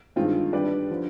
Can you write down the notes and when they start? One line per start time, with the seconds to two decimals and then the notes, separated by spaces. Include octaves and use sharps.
0.16 G2 D#3 G#3 C4 F4
0.52 G3 D4 G4 B4 D5
0.90 D3 F3